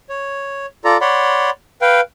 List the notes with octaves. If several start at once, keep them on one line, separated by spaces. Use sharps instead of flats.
C#5
F4 A4 D5 A#5
C#5 D5 F#5 B5 C6
B4 F5 G5